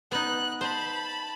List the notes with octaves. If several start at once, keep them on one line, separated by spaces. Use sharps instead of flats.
B3 D#4 F#6
C5 A5 B5